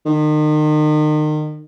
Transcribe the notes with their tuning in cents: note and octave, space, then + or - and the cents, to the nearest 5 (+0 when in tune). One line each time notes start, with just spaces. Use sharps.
D#3 -35